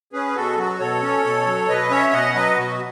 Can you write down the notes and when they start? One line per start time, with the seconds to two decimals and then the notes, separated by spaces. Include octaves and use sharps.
0.13 C#4 G#4 B4
0.35 B2 F#4 A4
0.57 F#3 F#4
0.80 B2 A4 C#5
1.02 C#4
1.25 B2
1.46 F#3
1.69 B2 B4 D#5
1.91 C#4 C#5 E5
2.13 B2 D#5 F#5
2.35 F#3 B4 D#5
2.57 B2 F#4